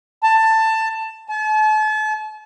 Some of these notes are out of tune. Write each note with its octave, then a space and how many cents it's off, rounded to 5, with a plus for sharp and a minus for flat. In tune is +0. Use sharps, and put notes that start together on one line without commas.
A5 +15
A5 -40